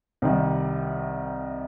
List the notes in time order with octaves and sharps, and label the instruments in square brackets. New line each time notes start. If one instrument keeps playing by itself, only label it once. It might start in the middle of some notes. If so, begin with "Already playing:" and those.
[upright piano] C2 C3 D#3 G3